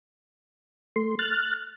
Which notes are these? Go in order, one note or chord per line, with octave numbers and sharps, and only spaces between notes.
A3 C6
F6 F#6 A6